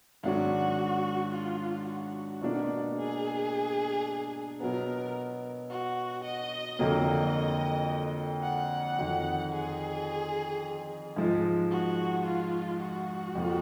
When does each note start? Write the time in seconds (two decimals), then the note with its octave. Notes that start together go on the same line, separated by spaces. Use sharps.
0.23 G#2 D#3 F#3 D4 F#4
1.33 F4
1.87 F#4
2.41 B2 A#3 D4
2.96 G#4
4.60 B2 F#3 B3 A#4
5.70 F#4
6.25 D#5
6.79 F2 D3 F#3 A#3 D#5
8.43 F#5
8.98 F2 D#3 F#3
9.52 G#4
11.16 G#2 F3 G#3
11.71 F#4
12.26 F4
12.81 F#4
13.35 F2 F3 A#3